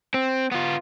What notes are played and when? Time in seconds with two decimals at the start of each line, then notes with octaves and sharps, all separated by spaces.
0.14 C4
0.51 B3 F4